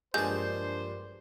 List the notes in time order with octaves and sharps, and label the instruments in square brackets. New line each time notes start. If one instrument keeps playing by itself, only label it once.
[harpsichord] A#1 G2 A5 [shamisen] G#3 [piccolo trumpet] C5 [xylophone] G6